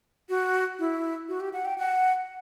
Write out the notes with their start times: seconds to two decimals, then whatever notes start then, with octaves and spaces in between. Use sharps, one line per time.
0.29 F#4
0.79 E4
1.29 F#4
1.40 G4
1.53 F#5
1.65 G5
1.78 F#5